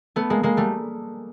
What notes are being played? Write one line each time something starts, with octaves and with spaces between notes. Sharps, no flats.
A3 B3
G#3 A#3
G#3 A#3
G3 A3